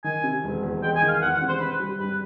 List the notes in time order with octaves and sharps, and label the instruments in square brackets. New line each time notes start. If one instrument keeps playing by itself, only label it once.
[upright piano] D#3 [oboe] G#5
[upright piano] C3
E1
E2
[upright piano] G#3 [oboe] G5
[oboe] G#5
[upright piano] D#3
[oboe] F5
[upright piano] E2 [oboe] F#5
[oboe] F#5
[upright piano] C3
[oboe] C5
[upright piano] C4 [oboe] B4
[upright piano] G3
[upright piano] G2 [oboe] B4